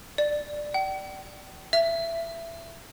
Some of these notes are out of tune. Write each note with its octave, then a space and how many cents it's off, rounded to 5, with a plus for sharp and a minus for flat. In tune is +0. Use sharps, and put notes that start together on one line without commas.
D5 +10
G5 -40
E5 +20